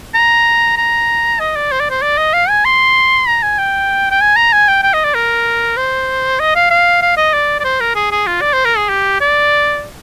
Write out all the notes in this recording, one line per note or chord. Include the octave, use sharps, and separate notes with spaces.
A#5
A#5
D#5
D5
C5
D5
C5
D5
D#5
F5
G#5
C6
A#5
G#5
G5
G5
G#5
A#5
G#5
G5
G5
D#5
D5
A#4
C5
D#5
F5
F5
F5
D#5
D5
D5
C5
A#4
G#4
G#4
F4
D5
C5
A#4
G#4
G4
D5